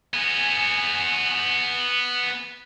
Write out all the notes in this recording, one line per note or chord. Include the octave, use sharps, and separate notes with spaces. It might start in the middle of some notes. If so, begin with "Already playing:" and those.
B3 G#4